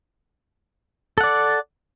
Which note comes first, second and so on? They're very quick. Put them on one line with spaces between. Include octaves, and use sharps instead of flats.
A4 F#5 D5